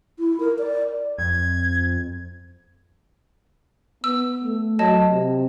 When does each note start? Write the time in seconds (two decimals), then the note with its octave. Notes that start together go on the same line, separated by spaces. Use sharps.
0.19 E4
0.40 A#4
0.59 D5
1.19 F2 G#6
4.04 B3 E6
4.44 A3
4.79 F#3 C#5 D#5 A5
5.11 C3